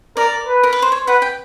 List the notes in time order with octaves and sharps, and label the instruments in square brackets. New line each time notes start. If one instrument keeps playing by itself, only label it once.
[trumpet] A#4 [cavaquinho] D5
[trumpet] B4
[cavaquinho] A#4
B4
C5
C#5
[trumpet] B4 [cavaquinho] F#5
[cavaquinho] G5